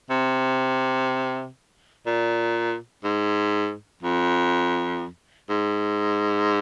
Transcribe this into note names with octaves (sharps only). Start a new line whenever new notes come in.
C3
A#2
G#2
F2
G#2